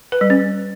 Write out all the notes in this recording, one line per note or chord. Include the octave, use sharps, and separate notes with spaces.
B4
G3
C#4